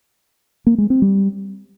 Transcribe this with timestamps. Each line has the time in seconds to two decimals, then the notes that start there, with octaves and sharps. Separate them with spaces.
0.67 A#3
0.78 G#3
0.90 C4
1.02 G3